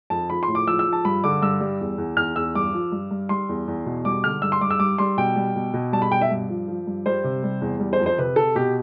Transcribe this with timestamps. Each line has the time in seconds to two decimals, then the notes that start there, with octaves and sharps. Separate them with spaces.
0.10 F2 A5
0.30 F3 B5
0.43 C6
0.48 A2
0.55 D6
0.67 F3 E6
0.79 E6
0.86 F3
0.93 A5
1.05 G2 B5
1.24 D3 D6
1.42 G2 E6
1.60 G3
1.80 E2
1.98 E2
2.17 E2 F6
2.36 E2 E6
2.55 G2 D6
2.73 F3
2.92 G2
3.11 G2
3.29 G3 C6
3.49 E2
3.68 E2
3.86 B2
4.05 G3 D6
4.24 D3 F6
4.42 G2 E6
4.52 C6
4.61 G2 D6
4.71 E6
4.80 G3 D6
4.98 G3 C6
5.17 B2 G5
5.36 G3
5.56 B2
5.74 B2
5.92 G3 A5
6.02 B5
6.11 B2 G5
6.21 E5
6.31 G2
6.49 F3
6.68 F3
6.87 G2
7.06 G3 C5
7.24 C3
7.43 G3
7.61 E2
7.80 G3
7.93 C5
7.99 F2
8.06 C5
8.18 C3 B4
8.36 C3 A4
8.55 B2 G4